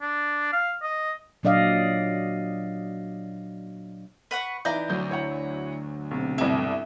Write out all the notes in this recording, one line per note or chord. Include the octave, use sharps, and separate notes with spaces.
D4
F5
D#5
A#2 F#3 D4 D5 D#5 F5
B4 F#5 C#6
E3 D#4 D5 E5 G#5 A#5 G6
D2 F#3 G6
E4 C#5 F#5
B1 C3
G1 C2 E4